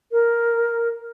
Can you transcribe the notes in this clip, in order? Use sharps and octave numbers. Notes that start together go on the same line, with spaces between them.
A#4